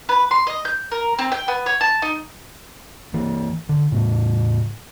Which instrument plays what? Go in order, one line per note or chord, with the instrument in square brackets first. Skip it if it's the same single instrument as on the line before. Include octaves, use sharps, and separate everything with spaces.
[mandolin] B4
C6
D#5
G6
A#4
C4
G5
B3
C#5
A5
D#4
[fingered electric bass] E3 A#3
D3
A2 C#3